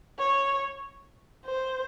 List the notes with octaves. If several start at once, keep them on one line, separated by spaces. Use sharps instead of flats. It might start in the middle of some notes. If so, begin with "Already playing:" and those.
C#5
C5